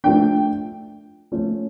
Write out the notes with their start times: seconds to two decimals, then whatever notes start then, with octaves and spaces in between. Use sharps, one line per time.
0.04 F3 A3 D4 G5
1.32 F3 A3 C#4